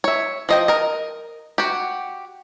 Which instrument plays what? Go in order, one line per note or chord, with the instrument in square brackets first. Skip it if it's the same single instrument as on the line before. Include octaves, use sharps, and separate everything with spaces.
[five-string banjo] C#5 E5
F3 D#5 G5
A#4 D#5
F#4 G4